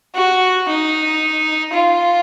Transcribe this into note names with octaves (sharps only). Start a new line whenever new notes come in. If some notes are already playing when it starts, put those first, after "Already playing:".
F#4
D#4
F4